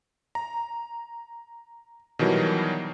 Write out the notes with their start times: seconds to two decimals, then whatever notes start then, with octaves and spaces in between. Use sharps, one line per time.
0.35 A#5
2.19 B2 D#3 E3 F#3 G3